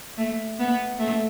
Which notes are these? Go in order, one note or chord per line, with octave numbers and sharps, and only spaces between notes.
A3
B3
A3